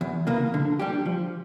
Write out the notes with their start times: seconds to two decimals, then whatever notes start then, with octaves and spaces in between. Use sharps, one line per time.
0.01 E2
0.27 C#3 E3 A#3
0.54 D3
0.79 G3 D4 G4
1.06 F3